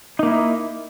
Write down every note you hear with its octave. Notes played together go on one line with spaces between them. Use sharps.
A#3 D#4 E4